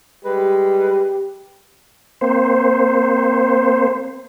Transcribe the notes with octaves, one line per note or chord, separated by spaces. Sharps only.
G3 G#3 G4 B4
A#3 C4 C5